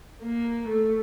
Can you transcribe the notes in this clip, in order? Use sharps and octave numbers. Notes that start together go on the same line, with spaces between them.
A#3
A3